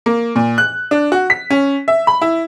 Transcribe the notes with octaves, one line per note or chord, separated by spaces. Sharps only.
A#3
A#2
F#6
D4
F#4
B6
C#4
E5
B5
E4